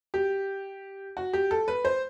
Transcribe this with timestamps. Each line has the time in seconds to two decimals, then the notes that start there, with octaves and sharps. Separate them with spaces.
0.14 G4
1.17 F#4
1.33 G4
1.51 A4
1.68 B4
1.85 C5